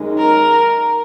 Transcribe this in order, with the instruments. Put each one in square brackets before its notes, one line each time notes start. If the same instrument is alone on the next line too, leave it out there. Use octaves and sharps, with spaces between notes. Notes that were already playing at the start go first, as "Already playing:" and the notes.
Already playing: [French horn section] F#2 D#3 G#3 D#4
[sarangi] A#4